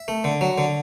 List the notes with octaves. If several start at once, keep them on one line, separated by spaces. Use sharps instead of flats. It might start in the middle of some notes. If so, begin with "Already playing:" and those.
Already playing: E5
A3
D3
F#3
D3